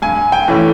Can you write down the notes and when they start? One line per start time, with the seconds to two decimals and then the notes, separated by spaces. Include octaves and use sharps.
0.02 G2 G#5
0.32 G5
0.48 E3 A3 C#4